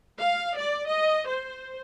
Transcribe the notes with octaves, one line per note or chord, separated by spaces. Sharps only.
F5
D5
D#5
C5